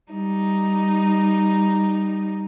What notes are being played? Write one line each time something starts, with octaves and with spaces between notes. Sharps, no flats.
G3 D#4